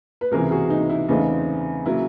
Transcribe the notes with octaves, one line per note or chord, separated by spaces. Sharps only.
B4
C#2 C3 E3 G#4 A#4
F#4 G#4
D#4
E4
E2 C#3 E3 A3 C4 D#4 F4
C#3 F#3 A#3 E4